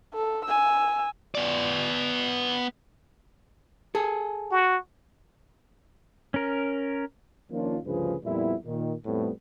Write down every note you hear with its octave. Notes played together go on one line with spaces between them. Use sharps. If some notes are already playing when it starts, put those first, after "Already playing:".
A4
G#5 E6
B3 D5
G#4 A4
F#4
C#4 A#4
D#3 F3 A#3 C#4 D4 F4
D2 G2 C#3 F3 G#4 B4
F2 A#2 G3 B3 E4
A#2 D#3
F2 A2 G3 A3 B3 C4